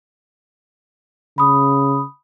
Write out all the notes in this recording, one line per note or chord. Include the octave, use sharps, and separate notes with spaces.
C#3 B5 D#6